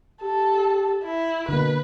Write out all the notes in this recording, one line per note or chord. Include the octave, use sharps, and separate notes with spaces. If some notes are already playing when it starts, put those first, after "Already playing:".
G4 A4
E4
B2 D3 A#3 B4